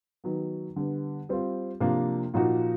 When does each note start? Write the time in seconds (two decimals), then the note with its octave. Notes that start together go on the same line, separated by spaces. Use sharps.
0.24 D#3 F#3 B3
0.76 D3 G3 B3
1.29 G3 C4 F4
1.80 C3 F3 A#3 D4
2.34 A#2 F3 A#3 D#4 F#4